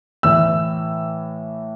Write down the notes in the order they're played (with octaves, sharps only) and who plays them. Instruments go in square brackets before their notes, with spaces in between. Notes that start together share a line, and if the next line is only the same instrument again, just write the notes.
[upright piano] A2 E3 E6